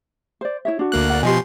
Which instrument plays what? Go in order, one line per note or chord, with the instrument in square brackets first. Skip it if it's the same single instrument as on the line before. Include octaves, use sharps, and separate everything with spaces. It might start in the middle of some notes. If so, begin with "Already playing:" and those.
[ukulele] C5 D5
E4 C#5 E5
D4 F#4
[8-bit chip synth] D2 A#3 F#6
[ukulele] D5 F#5
[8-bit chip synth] B2 F3 C6 [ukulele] G4 D#5 G#5